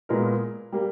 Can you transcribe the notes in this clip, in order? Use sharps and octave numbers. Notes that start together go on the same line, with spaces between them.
A#2 G#3 B3 A#4
G3 A#3